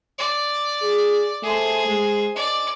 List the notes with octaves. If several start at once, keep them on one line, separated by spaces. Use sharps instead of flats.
D5
G#4
A3 G#4 C5
G#3
D5 D#5